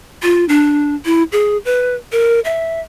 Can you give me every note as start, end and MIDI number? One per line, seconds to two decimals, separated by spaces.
0.22 0.45 65
0.49 0.95 62
1.05 1.23 64
1.32 1.57 68
1.65 1.94 71
2.12 2.40 70
2.45 2.81 76